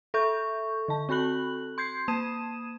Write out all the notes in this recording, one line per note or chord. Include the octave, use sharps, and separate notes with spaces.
A4 E5 C#6 G6
D3 A5
C4 F#4 A4 B5 F#6 F#7
C6 G6 G#6 C7
A#3 A5 D#6 G#6 D#7 E7